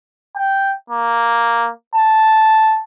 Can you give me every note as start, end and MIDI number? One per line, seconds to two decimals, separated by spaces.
0.35 0.73 79
0.90 1.70 58
1.95 2.82 81